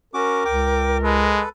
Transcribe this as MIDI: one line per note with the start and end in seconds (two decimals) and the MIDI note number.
0.14 0.44 61
0.14 0.44 66
0.14 1.43 70
0.14 0.44 86
0.45 1.43 37
0.45 0.98 79
0.45 0.98 86
1.04 1.43 56
1.04 1.49 69
1.04 1.49 71